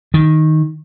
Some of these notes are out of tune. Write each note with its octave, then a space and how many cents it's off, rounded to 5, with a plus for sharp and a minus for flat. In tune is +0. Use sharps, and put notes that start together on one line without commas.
D#3 +5